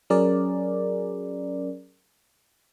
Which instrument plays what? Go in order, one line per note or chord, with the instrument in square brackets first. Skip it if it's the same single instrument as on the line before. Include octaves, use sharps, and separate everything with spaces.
[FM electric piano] F#3 C#4 G#4 A#4 D5